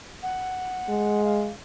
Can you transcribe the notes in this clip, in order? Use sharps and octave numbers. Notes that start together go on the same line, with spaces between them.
F#5
G#3
F5